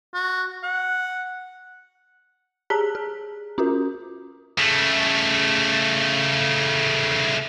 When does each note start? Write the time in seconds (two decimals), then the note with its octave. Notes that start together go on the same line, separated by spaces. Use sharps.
0.14 F#4
0.63 F#5
2.70 G4 G#4 A5 A#5 F#6 B6
2.95 G#4
3.58 C#4 F4 F#4 A#4
4.58 C#3 A3